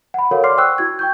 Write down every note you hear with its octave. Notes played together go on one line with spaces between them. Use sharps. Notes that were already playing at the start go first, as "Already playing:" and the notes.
F#5 B5
F#4 A4 A#4 C#5 F5 F#5
D5 C6 D6 F6 C7
C5 G5 C#6 E6 F#6
E4 F#4 G#6
G5 C#6 G6